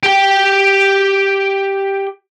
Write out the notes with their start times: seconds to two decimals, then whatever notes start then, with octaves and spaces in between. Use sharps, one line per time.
0.03 G4 G5